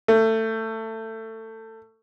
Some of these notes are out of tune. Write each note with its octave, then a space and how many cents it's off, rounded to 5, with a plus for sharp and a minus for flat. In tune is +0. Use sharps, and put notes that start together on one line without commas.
A3 +20